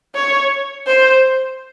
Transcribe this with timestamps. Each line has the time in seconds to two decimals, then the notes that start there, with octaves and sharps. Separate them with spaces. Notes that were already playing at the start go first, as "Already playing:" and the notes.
0.15 C#5
0.87 C5